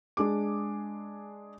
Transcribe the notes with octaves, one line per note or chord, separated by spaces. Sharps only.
G#3 D4 G#4 D6